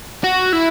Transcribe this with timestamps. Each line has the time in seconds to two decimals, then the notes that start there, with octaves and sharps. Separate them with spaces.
0.24 F#4
0.53 E4